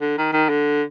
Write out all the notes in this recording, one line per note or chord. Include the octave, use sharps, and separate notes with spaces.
D3
D#3
D#3
D3